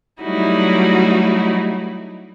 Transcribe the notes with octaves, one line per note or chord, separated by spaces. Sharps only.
F#3 G3 A3 D#4 E4 F#4